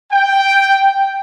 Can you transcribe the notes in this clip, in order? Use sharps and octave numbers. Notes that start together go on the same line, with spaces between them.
G5